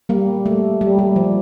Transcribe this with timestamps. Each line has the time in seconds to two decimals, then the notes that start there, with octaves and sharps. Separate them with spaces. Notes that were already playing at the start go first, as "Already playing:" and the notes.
0.09 G3 A#3
0.46 A3
0.81 G3
0.99 G3
1.16 F3